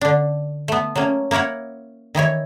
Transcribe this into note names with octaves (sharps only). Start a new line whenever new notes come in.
D3 D4
A3 B3
F#3 A3 A#3 C#4
A#3 E4 A#4 C#5 F#5
D#3 E3 E4 C#5